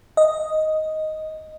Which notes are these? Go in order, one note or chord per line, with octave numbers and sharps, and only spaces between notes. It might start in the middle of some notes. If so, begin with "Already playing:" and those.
D#5